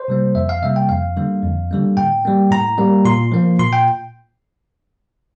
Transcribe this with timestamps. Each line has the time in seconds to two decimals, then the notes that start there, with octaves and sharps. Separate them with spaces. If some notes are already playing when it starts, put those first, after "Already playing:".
Already playing: C5
0.08 C3 G3 A#3
0.35 F2 E5
0.49 F5
0.63 C3 G3 A#3 E5
0.76 G5
0.89 F2 F5
1.16 D3 G3 A#3
1.43 F2
1.71 D3 G3 A#3
1.97 A2 G5
2.25 G3 A#3
2.51 A2 A#5
2.78 G3 A#3
3.05 A#2 C6
3.32 F3 A#3
3.59 A#2 C6
3.73 G5